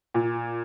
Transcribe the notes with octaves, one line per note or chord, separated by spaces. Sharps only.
A#2